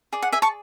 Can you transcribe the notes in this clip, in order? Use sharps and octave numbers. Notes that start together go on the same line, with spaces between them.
G#4 D5
F#5
E5 G#5
A5 C#6